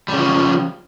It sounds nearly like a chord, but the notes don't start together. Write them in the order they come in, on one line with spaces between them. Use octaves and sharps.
G3 C#3 F3